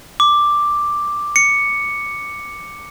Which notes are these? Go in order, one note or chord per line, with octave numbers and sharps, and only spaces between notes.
D6
C#7